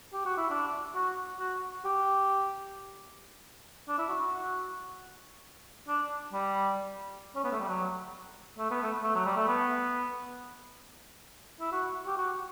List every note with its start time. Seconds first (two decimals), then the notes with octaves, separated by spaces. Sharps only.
0.13 G4
0.25 F#4
0.38 E4
0.50 D4
0.95 F#4
1.39 F#4
1.85 G4
3.88 D4
3.98 E4
4.09 F#4
5.88 D4
6.33 G3
7.36 C#4
7.44 B3
7.52 A3
7.60 G3
7.68 F#3
8.58 A3
8.71 B3
8.83 A3
9.03 A3
9.15 F#3
9.26 G3
9.37 A3
9.48 B3
11.60 E4
11.72 F#4
12.07 G4
12.17 F#4